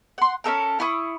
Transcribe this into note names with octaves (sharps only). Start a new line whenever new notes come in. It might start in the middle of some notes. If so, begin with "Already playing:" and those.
F#5 C6
C#4 D#4 A4 A#4
E4 B5 C#6 D#6